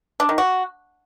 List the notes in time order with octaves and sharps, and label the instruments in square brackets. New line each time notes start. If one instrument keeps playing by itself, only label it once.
[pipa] D4
D#3
F#4